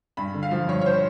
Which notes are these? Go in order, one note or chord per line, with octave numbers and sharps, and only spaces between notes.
G2 B5
D3
F5
F3
G2 C#5
C#5
C5